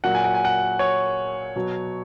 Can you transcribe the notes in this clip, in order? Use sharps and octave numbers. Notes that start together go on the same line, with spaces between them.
A#2 F#3 F#5
G#5
F#5
G#5
F#5
C#5
B2 F#3